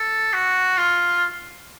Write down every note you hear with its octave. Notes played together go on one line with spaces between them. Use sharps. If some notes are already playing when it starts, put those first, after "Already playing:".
Already playing: A4
F#4
F4